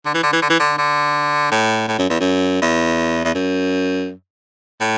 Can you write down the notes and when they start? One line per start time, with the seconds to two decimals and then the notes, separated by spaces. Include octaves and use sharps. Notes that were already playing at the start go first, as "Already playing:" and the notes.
0.05 D3
0.14 E3
0.23 D3
0.33 E3
0.42 D3
0.49 E3
0.60 D3
0.78 D3
1.51 A2
1.88 A2
1.98 F#2
2.10 E2
2.20 F#2
2.62 E2
3.24 E2
3.34 F#2
4.81 A2